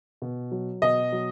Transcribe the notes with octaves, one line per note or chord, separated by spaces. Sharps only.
B2
F#3
B2 D#5
F#3